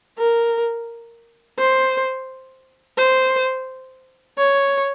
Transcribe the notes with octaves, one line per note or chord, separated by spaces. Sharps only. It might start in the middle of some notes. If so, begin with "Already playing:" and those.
A#4
C5
C5
C#5